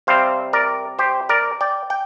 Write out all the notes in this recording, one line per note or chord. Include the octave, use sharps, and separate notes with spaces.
C3 G3 C4 C5 F5
A#4 D5
G4 C5
A#4 D5
D5 G5
G5